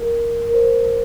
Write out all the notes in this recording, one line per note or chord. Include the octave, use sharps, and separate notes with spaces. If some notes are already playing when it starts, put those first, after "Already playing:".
Already playing: A#4
A#4
C5